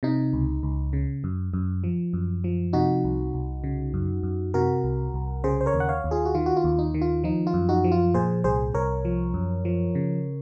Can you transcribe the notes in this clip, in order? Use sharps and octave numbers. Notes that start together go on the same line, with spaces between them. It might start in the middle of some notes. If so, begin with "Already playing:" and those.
C3 D#4
C#2
C#2
C#3
F#2
F#2
F3
F#2
F3
C3 D#4 F#4
C2
C2
C#3
F#2
F#2
C3 F#4 A#4
C2
C2
C#3 G#4 C5
C5
A#4 C#5
D#2
F#5
C#5 F5
D#2
F4 G#4
F#4
D#3 F4
F#4
F4
D#2
D#4
D#3
F4
F3 D#4
F4
F#2
D#4 F#4
F3
F4
A#2 G#4 C5
C2 G#4 C5
C2 A#4 C#5
F3
F#2
F3
C#3